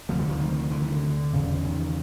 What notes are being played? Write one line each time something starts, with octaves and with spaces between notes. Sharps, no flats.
D2 C3 F3 G3
E3 F#3
D#3 F3
D#3 F3
D3 E3
D#3
D3
E2 C#3
D#3